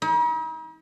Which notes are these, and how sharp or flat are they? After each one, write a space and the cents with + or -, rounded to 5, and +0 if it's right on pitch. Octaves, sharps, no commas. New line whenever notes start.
D#4 +45